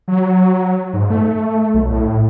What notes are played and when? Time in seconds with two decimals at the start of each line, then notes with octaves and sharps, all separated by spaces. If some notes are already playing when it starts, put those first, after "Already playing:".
0.08 F#3
0.93 G#2
1.10 A3
1.74 B1
1.90 A2